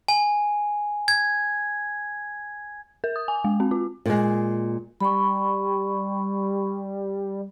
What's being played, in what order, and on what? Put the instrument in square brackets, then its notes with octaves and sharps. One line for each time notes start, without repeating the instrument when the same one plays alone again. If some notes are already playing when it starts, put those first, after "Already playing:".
[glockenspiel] G#5
G#6
[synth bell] A#4
D#6
G#5
G#3
C4
F4
[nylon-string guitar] A#2 G#3
[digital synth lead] G3 [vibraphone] B5 C#6